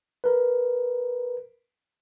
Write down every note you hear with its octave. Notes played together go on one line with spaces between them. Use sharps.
A#4 B4